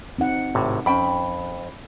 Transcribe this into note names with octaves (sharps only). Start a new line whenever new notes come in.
C4 D#4 F#5
G#1 A2 C3
F2 C#4 G5 B5